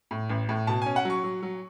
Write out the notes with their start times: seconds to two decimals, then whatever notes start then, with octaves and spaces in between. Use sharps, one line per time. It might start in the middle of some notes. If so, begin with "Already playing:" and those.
0.11 A2
0.30 A1
0.49 A2
0.67 B2 A5
0.82 C#4 G#5
0.96 F#5
1.05 F#3
1.10 C#6
1.24 F#3
1.43 F#3